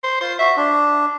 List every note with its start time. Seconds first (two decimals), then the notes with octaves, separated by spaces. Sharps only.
0.04 C5
0.21 F4 C5
0.39 F#4 E5
0.57 D4